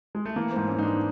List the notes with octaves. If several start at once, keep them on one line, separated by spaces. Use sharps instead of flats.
G#3
A3
E3 A#3
G#2 C4
C#4
G#2 D#4
D4